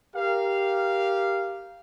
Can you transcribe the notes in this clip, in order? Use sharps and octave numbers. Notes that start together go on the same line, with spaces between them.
G4 A#4 F5